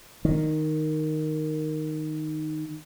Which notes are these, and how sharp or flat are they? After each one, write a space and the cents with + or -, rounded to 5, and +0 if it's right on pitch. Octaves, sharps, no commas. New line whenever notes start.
D#3 -5